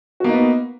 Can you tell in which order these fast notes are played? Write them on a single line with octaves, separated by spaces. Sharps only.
F#4 A#3 D#4 B3